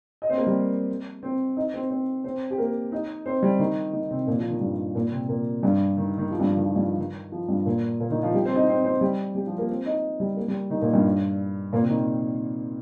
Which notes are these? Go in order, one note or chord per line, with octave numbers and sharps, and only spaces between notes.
D#5
C4 C5
A#3 A#4
G3 G4
C4 C5
D#4 D#5
C4 C5
C4 C5
C4 C5
G4
A#3 A#4
D#4 D#5
C4 C5
G3 G4
D#3 D#4
D#3 D#4
C3 C4
A#2 A#3
F3
D#3
G2 G3
A#2 A#3
C3 C4
A#2 A#3
G2 G3
D#3
D#3
F3
G2 G3
F3
D#3
F3
G2 G3
F3
D#3
F3
G2 G3
A#2 A#3
A#2 A#3
D#3 D#4
F3 F4
G3 G4
C4 C5
D#4 D#5
C4 C5
C4 C5
G3 G4
G3 G4
F3 F4
A#3 A#4
C4 C5
D#4 D#5
G3 G4
A#3 A#4
G3 G4
D#3 D#4
A#2 A#3
G2 G3
A#2 A#3
C3 C4
D#3 D#4